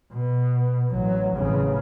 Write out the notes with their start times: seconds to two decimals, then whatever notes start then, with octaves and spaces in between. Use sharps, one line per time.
0.14 B2
0.92 A1 F#3
1.36 A1 C#3